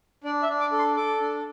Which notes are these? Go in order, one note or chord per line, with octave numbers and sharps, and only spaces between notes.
D4 D5
E5
D4
D6
A4
C6
A4 D6
D4